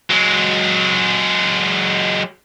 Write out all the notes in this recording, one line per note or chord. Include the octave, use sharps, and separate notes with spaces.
F#3 G#3